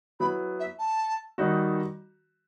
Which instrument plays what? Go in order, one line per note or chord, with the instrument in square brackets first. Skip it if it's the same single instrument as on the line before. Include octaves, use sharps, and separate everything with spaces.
[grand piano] F#3 B3 E4 [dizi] B5
[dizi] E5
A5
[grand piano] D#3 G3 D#4 F#4